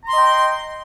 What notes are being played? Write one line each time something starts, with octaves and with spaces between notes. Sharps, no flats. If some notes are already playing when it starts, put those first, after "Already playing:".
D#5 G5 A#5 C6